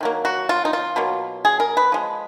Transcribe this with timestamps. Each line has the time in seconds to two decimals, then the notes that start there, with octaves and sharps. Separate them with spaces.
0.01 D#3 F#3 A#3
0.25 F#4
0.49 F4
0.65 D#4
0.73 F4
0.96 B2 F#3 A#3
1.45 G#4
1.60 A#4
1.77 B4
1.92 F3 G#3